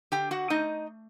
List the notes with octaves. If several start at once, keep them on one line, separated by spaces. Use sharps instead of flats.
D3 G4 G5
F#4 F#5
A3 D#4 D#5